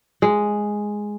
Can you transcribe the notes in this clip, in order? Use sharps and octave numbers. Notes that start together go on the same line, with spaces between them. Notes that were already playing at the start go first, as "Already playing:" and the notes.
G#3